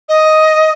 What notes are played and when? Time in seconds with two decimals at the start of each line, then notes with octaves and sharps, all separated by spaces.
0.09 D#5